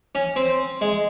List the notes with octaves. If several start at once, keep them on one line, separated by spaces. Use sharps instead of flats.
C#4
C4
G#3